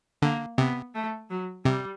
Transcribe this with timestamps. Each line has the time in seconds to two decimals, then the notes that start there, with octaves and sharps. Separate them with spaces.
0.22 D3 A#3
0.58 C3 B3
0.95 A3
1.30 F#3
1.65 C3 G3